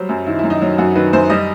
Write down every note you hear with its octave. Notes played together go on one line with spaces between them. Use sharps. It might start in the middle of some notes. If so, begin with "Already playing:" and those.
Already playing: F#3 G3 C5
F#2
D#3 E4
E4
F#2
D#4
F#3
F#2 F#4
D#3 B4
F#2 C5
G3 D#5